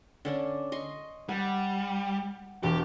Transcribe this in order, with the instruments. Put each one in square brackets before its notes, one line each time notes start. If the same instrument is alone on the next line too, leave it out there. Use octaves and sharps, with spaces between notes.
[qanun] D3 C#4 D4
D#5 C6 C#6
[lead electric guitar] G3 [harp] F#5 [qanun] G#5
[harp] E1 [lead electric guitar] G4